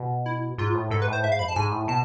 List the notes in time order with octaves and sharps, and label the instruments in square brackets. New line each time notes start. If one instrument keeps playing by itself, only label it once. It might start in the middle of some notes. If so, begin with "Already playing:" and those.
Already playing: [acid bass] B2
[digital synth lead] E4
[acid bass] G#2 [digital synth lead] F4
[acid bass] A2
[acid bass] G#2 [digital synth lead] A4
[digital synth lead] B4
[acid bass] A2
[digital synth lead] C5
[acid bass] G#2 [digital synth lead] E5
[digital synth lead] F5
[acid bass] F2 [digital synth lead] B5
[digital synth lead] A5
[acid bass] G#2 [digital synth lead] G#5
[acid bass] A2
[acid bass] B2 [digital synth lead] A5